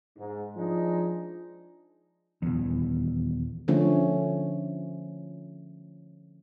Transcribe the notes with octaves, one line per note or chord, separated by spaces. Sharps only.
G#2
F3 G#3 D4 D#4
D#1 E2
D3 F3 A3 C#4